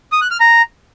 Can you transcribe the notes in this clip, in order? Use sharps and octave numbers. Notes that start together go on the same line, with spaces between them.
D#6
F#6
F6
A#5